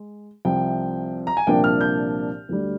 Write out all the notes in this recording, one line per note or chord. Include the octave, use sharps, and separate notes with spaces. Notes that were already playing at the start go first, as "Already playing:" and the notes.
Already playing: G#3
C2 C3 F3 G5
A#5
G#5
C2 A#2 F3 A#3 D4 G5
F6
G6
D2 D3 G3